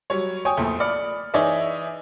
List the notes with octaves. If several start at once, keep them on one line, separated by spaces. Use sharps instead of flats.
F#3 G3 C#5
C#5 G5 G#5 D#6
A#1 E2 A#2 A3
D5 B5 F6 C#7
E3 D#4 G#4 C#5 D5 E5